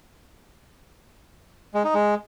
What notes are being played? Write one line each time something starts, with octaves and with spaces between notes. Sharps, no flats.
G#3
D#4
G#3